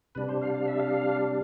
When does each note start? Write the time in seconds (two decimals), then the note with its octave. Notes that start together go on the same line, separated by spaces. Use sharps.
0.15 C3 G3 D4 B4
0.29 C5
0.41 F5
0.54 F5
0.68 E5
0.79 F5